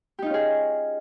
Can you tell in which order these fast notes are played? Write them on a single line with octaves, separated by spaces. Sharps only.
G4 D#4 F4 C#4 G#4